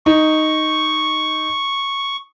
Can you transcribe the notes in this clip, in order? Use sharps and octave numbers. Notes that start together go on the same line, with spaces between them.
D#4 C#6